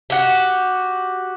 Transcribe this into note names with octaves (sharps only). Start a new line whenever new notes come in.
F#4 G4